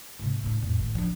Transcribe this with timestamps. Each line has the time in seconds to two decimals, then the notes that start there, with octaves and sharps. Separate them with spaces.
0.19 G#2 C3
0.43 A2 D3
0.62 F2 A2
0.76 A1 D#3
0.95 F3 D4